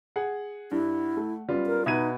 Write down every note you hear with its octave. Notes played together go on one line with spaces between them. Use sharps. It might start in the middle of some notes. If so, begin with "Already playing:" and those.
G#4 F#5
G2 E4
A3
F#2 G3 B3 F4
A#4
B2 D#4 B4 E5 G#6 D#7